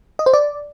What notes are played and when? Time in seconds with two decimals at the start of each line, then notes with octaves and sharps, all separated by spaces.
0.19 D#5
0.26 C5
0.34 D5